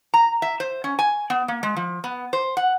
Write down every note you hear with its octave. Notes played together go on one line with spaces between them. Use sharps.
A#5
E5
C5
C#4
G#5
B3
A#3
G#3
F3
B3
C5
F#5